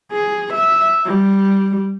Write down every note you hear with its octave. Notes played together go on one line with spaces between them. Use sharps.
G#4
E5
G3